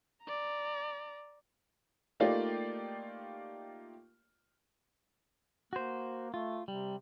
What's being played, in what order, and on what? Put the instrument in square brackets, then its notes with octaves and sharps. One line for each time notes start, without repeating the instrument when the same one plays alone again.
[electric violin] D5 A#5
[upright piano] A3 A#3 D#4 F4 G4 D5
[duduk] A#3 [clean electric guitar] F#4 C5
[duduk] A3 [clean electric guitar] F4
[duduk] C3 [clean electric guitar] G3